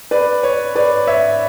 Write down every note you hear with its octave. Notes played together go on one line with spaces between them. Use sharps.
B4 D5
C#5
B4 D5
C#5 E5